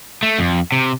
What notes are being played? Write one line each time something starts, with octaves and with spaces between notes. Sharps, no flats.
A3
F2
C3